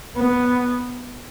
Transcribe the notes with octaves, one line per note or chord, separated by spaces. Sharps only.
B3